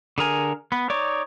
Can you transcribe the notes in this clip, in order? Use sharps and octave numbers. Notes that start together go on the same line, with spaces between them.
D3 G#4 A#4 G#5
B3
D#4 C#5 D5